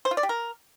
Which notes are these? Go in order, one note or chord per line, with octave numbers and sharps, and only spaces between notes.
C5
F4
D5
G4
A#4